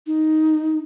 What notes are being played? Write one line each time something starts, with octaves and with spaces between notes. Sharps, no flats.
D#4